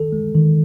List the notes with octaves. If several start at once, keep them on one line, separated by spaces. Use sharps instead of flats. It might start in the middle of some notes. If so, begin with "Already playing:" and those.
Already playing: D#3 A4
G#3
D#3